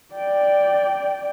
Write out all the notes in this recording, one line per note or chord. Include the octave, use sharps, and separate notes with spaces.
D5 G5